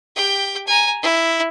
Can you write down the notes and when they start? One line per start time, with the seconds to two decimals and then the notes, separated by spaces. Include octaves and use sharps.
0.16 G4 G5
0.67 G#5 A#5
1.02 E4